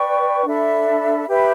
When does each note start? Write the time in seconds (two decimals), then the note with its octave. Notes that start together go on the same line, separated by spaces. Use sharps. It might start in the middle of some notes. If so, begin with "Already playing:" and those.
Already playing: B4 D5 G5 C#6
0.45 D4 A4 E5 B5
1.27 G4 B4 E5 B5